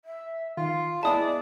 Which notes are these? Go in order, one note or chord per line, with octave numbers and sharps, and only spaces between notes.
E5
D#3 F4 F5
G#3 B3 E4 D5 A5 B5 D#6